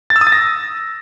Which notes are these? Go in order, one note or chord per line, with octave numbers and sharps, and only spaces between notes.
A6
E6
D#6
A6
A#6